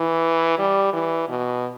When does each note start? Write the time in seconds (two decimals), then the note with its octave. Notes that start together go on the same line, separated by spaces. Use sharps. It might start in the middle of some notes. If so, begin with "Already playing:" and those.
Already playing: E3
0.59 G3
0.93 E3
1.29 B2